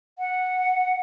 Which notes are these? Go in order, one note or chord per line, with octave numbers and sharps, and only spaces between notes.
F#5